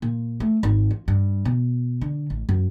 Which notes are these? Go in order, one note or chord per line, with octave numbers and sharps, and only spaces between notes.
A#2
A3
G#1
F4
G2
B2
D3
A1
F#2